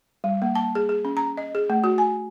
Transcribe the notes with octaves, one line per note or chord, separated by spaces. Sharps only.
G3
A#3
A5
G#4
G#4
C#4
A#5
D#5
G#4
A3
F#4
G#5